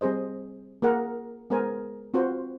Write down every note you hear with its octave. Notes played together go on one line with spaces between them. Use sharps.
G3 C4 G#4 C5 D#5
A#3 G#4 A#4 F#5
G#3 B3 G#4 A#4 C5 G#5
C4 F4 F#4 B4 C5